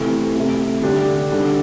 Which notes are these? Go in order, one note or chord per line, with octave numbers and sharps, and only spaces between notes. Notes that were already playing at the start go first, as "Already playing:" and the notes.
Already playing: C3 E3 A3
C3 A3 E4
D3 G3 D4 G4
D3 G3 D4